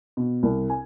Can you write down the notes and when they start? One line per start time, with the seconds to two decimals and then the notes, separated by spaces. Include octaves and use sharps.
0.17 B2
0.43 C2
0.70 G#5